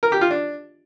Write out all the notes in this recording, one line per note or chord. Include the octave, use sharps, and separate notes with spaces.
A#4
G4
F4
D4